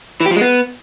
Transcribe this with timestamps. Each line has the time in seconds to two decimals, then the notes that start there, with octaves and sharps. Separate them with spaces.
0.20 E3
0.26 G4
0.31 F3
0.36 G#3
0.41 B3